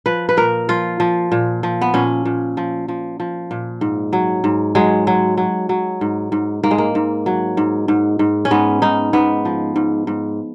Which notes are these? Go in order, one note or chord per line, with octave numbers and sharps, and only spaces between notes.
F3 B4
B4
A#2 A#4
F3 F4
F3
A#2
F3
B3
A#2 C#4
A#2
F3
F3
F3
A#2
G#2
F#3
G#2
F#3 G#3
F#3
F#3
F#3
G#2
G#2
G#2 A#3
G#3
A#3
G#2
F#3
G#2
G#2
G#2
C#4
G#2 B3
G#2 D#4
G#2 B3
F3
G#2
G#2